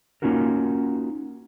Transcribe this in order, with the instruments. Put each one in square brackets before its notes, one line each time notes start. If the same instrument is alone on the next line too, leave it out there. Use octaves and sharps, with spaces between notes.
[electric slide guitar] A#3 C#4 D#4 F4 F#4 A#4